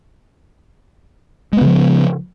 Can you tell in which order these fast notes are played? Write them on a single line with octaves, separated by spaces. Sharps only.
G#3 B3 C#3 F3